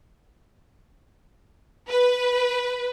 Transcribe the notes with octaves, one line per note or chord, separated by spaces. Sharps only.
B4